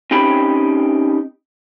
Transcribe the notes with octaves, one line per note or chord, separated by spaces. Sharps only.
C4 C#4 D#4 G4 G5 B5